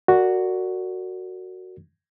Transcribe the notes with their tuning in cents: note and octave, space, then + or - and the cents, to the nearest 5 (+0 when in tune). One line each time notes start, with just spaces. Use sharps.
F#4 +0 A#4 -30 D5 +0